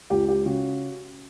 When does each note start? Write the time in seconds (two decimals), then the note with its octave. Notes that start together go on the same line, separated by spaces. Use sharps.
0.10 C#2 G4
0.29 G4
0.45 C#3 F#4